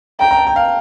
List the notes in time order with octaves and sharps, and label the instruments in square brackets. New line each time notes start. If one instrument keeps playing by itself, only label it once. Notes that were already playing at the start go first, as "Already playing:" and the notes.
[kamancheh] G5 [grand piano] A#5
[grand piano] A#5
A5
G5
F5